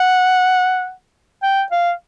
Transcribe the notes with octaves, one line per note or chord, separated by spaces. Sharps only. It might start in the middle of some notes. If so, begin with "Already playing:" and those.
Already playing: F#5
G5
F5